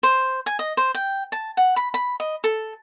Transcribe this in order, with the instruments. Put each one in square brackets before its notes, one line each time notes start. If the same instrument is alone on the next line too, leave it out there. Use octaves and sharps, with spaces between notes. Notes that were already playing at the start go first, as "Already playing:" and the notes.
[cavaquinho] C5
G#5
D#5
C5
G5
A5
F#5
B5
B5
D#5
A4